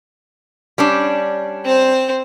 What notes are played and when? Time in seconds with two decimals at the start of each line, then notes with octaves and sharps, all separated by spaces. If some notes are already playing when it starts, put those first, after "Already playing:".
0.78 G3 C#4 D4
1.65 C4 C5